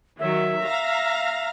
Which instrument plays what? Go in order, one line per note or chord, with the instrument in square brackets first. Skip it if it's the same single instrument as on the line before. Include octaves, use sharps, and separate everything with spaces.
[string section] D#3 F#3 [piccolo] E5
[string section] F5 A#5 A#6